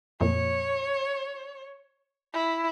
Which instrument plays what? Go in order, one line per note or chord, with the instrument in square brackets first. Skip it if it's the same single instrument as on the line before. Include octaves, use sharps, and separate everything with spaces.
[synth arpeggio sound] F2 A#2 [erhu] C#5
[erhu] E4